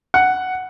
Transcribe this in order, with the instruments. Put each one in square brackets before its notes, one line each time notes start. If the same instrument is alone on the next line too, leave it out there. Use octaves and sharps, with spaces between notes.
[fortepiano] F#5